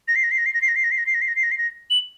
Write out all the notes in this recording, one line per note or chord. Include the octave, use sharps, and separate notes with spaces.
A#6
C7
A#6
C7
A#6
C7
A#6
C7
A#6
C7
A#6
C7
A#6
C7
A#6
C7
A#6
C7
A#6
C7
A#6
F#7